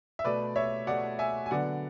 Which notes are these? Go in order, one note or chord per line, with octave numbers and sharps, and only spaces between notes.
E5
B2 A3 B4 D5
C#5 E5
B2 A3 D5 F#5
E5 G#5
G#5
D3 F#3 B3 D5 F#5